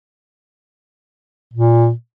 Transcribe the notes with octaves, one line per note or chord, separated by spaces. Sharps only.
A#2